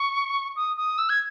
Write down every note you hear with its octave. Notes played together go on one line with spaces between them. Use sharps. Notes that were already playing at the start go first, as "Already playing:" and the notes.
Already playing: C#6
D#6
D#6
E6
G#6